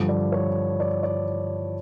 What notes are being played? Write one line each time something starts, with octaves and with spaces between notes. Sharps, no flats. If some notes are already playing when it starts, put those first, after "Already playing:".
Already playing: G2 D3 F3
D5
C#5
D5
D5